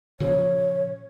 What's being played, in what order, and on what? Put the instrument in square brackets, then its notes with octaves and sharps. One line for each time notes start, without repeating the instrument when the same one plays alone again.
[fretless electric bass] A#2 C#3 F3 [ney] C#5